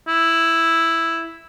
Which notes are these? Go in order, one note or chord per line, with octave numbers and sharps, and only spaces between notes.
E4